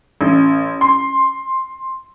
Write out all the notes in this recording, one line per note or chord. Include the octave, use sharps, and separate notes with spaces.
A1
C6